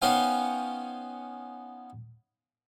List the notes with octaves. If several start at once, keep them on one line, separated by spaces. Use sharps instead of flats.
B3 C#4 D#4 C5 F5 G5